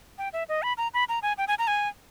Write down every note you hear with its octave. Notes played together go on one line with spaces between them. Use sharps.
G5
E5
D#5
B5
A#5
B5
A#5
G#5
G5
G#5
A#5
G#5